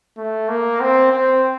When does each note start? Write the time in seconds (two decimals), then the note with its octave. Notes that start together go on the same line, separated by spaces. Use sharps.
0.17 A3
0.48 A#3
0.80 C4
1.12 C4